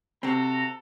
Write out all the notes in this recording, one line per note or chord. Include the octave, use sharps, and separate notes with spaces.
C3 C4 F#4 A4 A#5